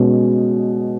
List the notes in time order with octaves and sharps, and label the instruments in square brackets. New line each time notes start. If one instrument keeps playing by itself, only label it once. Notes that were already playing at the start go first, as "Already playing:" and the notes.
Already playing: [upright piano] B2 G#3 C#4